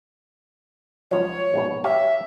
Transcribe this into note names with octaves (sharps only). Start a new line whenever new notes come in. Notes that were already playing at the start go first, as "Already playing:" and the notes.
C#2 F3 F#3 C#5
A#1 G#2 B2
G4 C#5 E5 F5